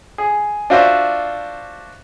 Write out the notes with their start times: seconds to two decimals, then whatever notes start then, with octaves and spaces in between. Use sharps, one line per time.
0.18 G#4
0.70 D4 F4 F#4 C5 D5 E5